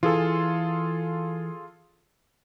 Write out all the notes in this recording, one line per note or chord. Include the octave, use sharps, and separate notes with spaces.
E3 F4 G#4 A4